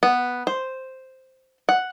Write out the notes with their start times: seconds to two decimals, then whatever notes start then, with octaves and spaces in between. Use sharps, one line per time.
0.03 B3
0.47 C5
1.69 F#5